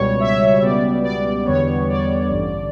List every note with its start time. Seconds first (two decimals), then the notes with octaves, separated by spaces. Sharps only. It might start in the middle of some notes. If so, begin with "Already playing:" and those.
Already playing: C#2 B2 G3 C#5
0.20 E5
0.62 C#2 B2 G3 B3 D5
1.04 D5
1.45 E2 D3 G3 B3 C#5
1.88 D5
2.30 A1 G2 D3